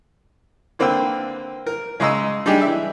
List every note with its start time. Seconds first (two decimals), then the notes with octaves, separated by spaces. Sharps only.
0.79 D3 A#3 C4 B4 G5 E6
1.66 A#4
2.00 C#3 G#3 D#5 A#5 E6
2.46 G3 D4 D#4 G4 G#4
2.61 E3 E5